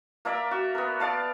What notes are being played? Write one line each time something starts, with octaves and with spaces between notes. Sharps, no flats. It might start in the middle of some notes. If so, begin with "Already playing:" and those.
A#3 A#4 D5 E5
F#4
B3 A#4
D5 F5 A5